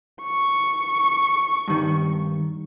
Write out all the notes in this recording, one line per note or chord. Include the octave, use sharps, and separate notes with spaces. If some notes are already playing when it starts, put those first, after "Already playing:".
C#6
G2 D#3